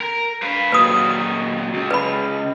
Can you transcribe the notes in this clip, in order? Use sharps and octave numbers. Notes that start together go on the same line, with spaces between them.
A#4
B4 F5
A#2 F#3 B4 D#6
C#2
B4 B5